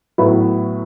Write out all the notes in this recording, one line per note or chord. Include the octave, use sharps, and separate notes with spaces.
A2 F#3 B3 E4